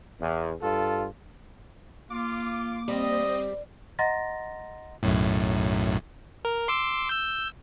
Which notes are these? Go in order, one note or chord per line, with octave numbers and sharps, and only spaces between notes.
E2
G2 F4 A4
A#3 F4 D6
G3 C4 D#5
D#5 F#5 A#5 C6 A6 A#6
B1 F#2 A2
A#4
C6 D6 E6
E6 G6